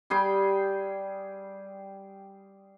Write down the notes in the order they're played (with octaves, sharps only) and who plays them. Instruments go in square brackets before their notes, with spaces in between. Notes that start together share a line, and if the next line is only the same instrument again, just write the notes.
[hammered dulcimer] G3 G#4 G5 C6